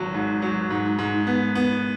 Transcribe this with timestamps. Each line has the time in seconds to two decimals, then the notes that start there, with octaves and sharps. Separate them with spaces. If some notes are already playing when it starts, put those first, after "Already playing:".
Already playing: G#1 F#3
0.14 G#2
0.42 F#3
0.70 G#2
0.99 G#2
1.27 B3
1.55 B3